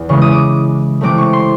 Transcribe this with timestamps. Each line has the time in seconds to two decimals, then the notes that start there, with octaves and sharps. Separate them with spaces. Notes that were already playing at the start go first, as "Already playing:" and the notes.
Already playing: E2
0.09 C#3 E3 G#3 C#4 C#6
0.22 D#6
0.32 D6
1.01 C3 E3 A3 C4 D6
1.18 C#6
1.33 C6